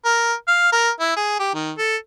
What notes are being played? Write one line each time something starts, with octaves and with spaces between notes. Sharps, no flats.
A#4
F5
A#4
E4
G#4
G4
D#3
A4